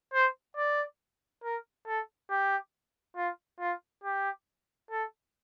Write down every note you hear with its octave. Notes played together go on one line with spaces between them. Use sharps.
C5
D5
A#4
A4
G4
F4
F4
G4
A4